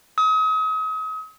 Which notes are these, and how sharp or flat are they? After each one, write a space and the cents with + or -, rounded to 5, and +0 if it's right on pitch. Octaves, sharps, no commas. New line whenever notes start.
D#6 +40